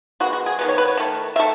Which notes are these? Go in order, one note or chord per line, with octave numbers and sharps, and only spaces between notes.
D#3 G#3 B3 F#4
F#4
G#4
D#3 G#3 B3 B4
C#5
B4
C#5
D#3 A3
D#3 A3 E5